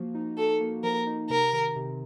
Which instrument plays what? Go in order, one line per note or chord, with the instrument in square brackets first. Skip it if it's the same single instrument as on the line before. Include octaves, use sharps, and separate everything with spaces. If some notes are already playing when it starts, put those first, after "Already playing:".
Already playing: [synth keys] F3 A#3 F#4
D#4
[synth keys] F#4 [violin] A4
[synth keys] A#3
[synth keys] F3 [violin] A#4
[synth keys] D#4
[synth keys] C3 [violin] A#4
[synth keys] D#3
C3